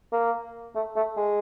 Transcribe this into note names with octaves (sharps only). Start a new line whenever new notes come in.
A#3
A3
A3
G#3